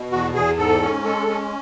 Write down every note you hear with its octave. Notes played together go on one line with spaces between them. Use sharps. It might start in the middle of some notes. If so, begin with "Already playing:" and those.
Already playing: B2
E2 F#4
E2 G#4
G#2 A4
C#4
G#3 A4
C#4